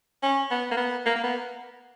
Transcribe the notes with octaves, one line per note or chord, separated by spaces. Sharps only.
C#4
B3
A#3
B3
A#3
A#3
B3